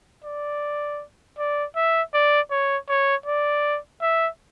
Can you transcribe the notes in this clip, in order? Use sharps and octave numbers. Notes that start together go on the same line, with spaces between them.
D5
D5
E5
D5
C#5
C#5
D5
E5